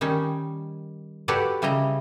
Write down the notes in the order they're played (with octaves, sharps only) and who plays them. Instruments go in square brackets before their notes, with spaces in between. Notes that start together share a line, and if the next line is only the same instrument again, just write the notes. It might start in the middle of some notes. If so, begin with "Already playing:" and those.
[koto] D#3 G3 C#4 D#4
F#4 G4 A4 B4 C#5 D5
C#3 G3 E4 D#5 A#5